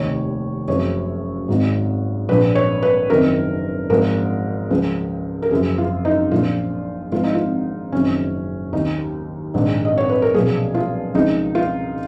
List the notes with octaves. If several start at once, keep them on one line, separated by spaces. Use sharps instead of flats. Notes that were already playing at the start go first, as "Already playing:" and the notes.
Already playing: F1 D#2 D#3 C#5
F#1 F#2 C#3 F3 C#5
G#1 G#2 D#3
A#1 A#2 F3 B4
C#5
B4
F#1 F2 D#3 A#4
G#1 G#2 F3 A#4
C#2 C#3 F3
A#4
F#1 F#2 F3 G#4
F4
D#4
A#1 A#2 F3 F4
G#1 G#2 F3 F4
D#4
F4
F#1 F2 D#3 C#4
D#2 D#3 D#4
A#1 G#2 D#3
D#5
C#5
B4
A#4
B1 A#2 F3 G#4
F4
C#2 C#3 F3 D#4
F4